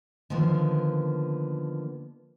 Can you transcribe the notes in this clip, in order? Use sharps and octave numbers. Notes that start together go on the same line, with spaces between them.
D3 D#3 F3 A#3 B3